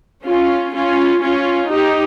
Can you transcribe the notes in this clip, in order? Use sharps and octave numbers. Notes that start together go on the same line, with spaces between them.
C#4 F4
C#4 F4
C#4 F4
D#4 G4